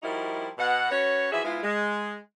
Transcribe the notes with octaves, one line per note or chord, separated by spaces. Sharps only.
F3 G3 D#4 E4 F#4 A#4
B2 F#5
C#4 F#4 B4 C#5
E3 F3 F#4 G#4 E5
G#2 G#3 B3 E4 F4
G#3